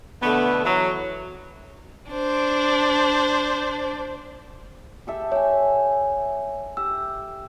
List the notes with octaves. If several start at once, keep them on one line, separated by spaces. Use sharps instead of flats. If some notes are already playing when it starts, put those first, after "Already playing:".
B2 D3 A3 B3
E3 F#3
D4 C5
G4 A4 E5
C#5 E5 G#5
G4 E6